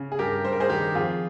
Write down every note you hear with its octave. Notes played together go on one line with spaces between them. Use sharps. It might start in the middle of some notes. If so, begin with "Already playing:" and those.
Already playing: C#3
G#4
G2 G4 A#4
G3 C5
A#4
G#4 C5
D#3 G4 A#4
F2 F4 G#4